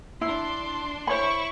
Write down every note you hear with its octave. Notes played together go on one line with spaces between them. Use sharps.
D4 E4 C6
E4 C5 C#5 B5 C#6